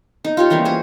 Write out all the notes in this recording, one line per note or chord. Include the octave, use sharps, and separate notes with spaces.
D#4
F4 G4 C#5
E3 G3 A#3 C#4
G#4 C5 C#5